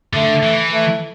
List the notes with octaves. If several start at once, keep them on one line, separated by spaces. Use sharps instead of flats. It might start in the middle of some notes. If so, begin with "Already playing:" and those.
D3 A3
E3
A3